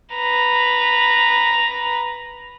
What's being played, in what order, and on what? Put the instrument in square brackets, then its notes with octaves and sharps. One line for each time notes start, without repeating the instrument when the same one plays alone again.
[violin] B4 A#5